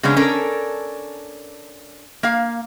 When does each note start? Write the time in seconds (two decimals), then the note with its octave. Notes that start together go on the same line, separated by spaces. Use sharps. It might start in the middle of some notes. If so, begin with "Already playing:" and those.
0.03 C#3 G#3 B3 C#4 D4
0.16 C#4 D4 A4 A#4
2.23 A#3 F5